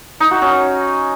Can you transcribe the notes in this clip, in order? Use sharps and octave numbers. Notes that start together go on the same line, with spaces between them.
D#4
F#4
C#4